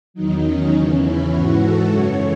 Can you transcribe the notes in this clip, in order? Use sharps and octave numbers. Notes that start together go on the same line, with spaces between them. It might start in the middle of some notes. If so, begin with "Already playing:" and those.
E2 D#3 F#3 D#4
C#4
E2 C#3 E3
E4
G#2 E3 F#4
A4
F#2 C#3 E3 C#5